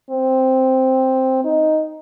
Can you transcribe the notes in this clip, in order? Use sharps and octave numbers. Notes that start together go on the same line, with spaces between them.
C4
D#4